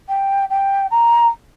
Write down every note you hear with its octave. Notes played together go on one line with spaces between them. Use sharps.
G5
G5
A#5